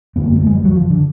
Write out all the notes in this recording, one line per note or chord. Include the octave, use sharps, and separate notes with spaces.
F#2 D3 B3
A#3
A3
G#3
G3
F#3
F3
D3